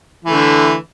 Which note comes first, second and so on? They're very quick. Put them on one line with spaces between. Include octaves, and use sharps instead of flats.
E3 A3 D3